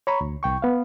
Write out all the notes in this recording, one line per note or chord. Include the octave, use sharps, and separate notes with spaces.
C#5 A#5 B5 C#6
D2
C2 G5 C#6
B3 F5